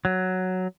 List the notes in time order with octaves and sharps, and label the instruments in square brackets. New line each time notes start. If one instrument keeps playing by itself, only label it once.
[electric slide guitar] F#3